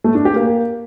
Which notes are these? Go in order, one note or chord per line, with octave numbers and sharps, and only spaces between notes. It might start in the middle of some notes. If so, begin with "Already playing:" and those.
A3
D4
G4
A#3